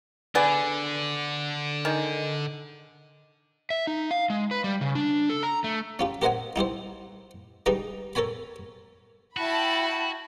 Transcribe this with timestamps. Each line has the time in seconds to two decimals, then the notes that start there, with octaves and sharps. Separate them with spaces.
0.35 D3 B3 G#4 D5
1.85 D#3 G#3
3.70 E5
3.87 D#4
4.11 F5
4.30 G#3
4.51 B4
4.64 G3
4.81 C#3
4.95 D4
5.30 A4
5.43 A#5
5.64 A3
5.99 C#4 F4 G4
6.22 G4 A#4 C5 D#5 F#5 G#5
6.56 D#4 E4 G4 C5
7.66 G3 G#3 D4 D#4 B4 D#5
8.15 A4 A#4 C#5 G#5 B5
9.37 E4 F#4 G5 A5 B5